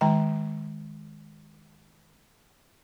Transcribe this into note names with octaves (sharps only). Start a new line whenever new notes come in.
D#3 G#3 G5 A#5